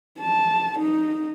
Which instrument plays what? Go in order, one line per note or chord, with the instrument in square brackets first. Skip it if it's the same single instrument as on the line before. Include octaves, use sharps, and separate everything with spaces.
[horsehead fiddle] A5
D#4